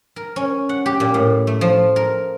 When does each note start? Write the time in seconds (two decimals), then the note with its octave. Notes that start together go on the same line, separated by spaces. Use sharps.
0.16 A#4
0.36 C#4
0.69 F#5
0.86 G4
1.00 A#2
1.14 A2
1.47 A3
1.61 F3
1.96 A#4